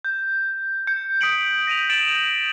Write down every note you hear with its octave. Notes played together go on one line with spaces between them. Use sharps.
G6
G6 C#7
D#6 B6 C#7 D7 F#7
A#6 D#7 F7
A6 D7 E7 F#7